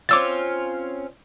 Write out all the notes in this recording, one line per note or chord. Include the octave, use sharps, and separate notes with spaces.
C4 C#4 F4 D6 E6 A6